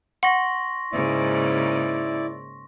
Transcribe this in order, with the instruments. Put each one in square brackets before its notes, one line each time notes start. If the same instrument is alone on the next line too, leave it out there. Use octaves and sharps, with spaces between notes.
[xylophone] F#5 [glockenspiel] C6 C#6 A#6
[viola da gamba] G#2 C#3 A#3 [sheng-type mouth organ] E4 D5